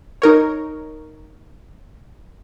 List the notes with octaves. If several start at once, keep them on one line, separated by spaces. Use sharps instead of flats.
D#4 A#4 C#5